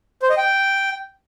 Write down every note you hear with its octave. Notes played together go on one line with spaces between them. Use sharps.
C5
D#5
G5